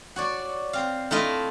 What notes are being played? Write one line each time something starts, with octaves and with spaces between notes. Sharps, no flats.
F#4 C#5 D5
C4 F5
A3 E4 F4 D#5